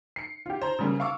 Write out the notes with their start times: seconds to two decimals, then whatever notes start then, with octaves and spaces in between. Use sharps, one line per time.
0.16 C7 C#7
0.46 F4 G4
0.62 C5 A#5
0.79 C#3 G3 A#3
1.00 F5 C#6 D6 E6